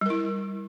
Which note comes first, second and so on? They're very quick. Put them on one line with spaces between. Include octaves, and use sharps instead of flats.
G3 A#4 E4